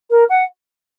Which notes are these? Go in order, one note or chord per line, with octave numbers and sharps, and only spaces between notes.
A#4
F#5